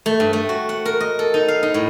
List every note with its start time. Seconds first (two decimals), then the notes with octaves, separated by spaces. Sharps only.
0.06 A3
0.20 G2
0.33 A3
0.49 F#4
0.69 F#5
0.86 A#4
1.00 D#5
1.19 A4
1.34 D#4
1.48 F5
1.63 D#4
1.74 A2